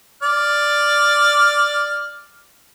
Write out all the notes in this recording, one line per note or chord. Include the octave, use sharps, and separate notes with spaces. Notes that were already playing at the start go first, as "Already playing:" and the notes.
D5 F6